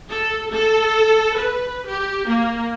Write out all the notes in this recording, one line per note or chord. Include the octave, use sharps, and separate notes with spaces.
A4
A4
B4
G4
A#3